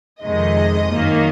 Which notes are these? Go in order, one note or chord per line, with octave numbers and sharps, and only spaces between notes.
F2 C3 D#3 G#3 D#5
F#2 D#3 A#3